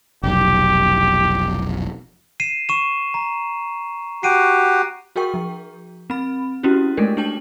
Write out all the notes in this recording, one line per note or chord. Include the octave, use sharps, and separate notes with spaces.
F1 B1 G4
C7 D#7 E7
C#6 D#7 E7
A#5
F#4 G4 C7 D7 D#7
F#4 G#4 A#4 G5 C#6
F3
C4 B5
C#4 E4 F#4 G4
G#3 A3 D4 A4 A#4
D4 G5 A5 F#7